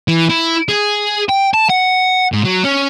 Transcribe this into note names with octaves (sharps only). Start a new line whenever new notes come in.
E3
E4
G#4
G5
A5
F#5
G#2
F#3
C#4